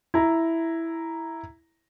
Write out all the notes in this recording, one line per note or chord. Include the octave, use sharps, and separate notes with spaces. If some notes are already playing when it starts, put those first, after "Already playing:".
E4 A#5